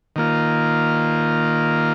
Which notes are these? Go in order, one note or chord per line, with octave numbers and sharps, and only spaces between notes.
D#3 A#3 F4